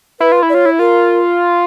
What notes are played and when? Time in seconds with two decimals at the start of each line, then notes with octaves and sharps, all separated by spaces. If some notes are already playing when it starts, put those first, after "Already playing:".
0.20 E4 B4
0.32 F4
0.43 E4
0.49 D5
0.53 F4 C#5
0.66 E4
0.79 F4 A#4